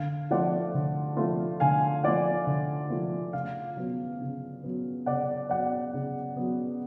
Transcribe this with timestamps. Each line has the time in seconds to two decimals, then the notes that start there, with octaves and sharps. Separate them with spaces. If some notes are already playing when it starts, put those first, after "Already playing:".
Already playing: D3 F5
0.31 F3 A3 F4 D5 F#5
0.74 D3
1.17 F3 A3 F4
1.60 D3 F5 G#5
2.03 F3 A3 F4 D5 F#5
2.47 D3
2.90 F3 A3 F4
3.33 C#3 F5
3.77 F#3 B3
4.21 C#3
4.63 F#3 B3
5.06 C#3 D5 F#5
5.49 F#3 B3 D5 F#5
5.94 C#3
6.36 F#3 B3